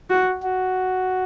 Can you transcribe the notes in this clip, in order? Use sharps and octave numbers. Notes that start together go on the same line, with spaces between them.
F#4
F#4